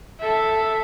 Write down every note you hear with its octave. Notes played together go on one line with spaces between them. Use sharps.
A4 E5